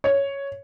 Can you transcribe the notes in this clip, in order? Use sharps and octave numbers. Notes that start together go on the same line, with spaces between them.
C#5